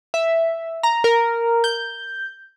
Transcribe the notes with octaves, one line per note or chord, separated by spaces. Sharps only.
E5
A#5
A#4
G6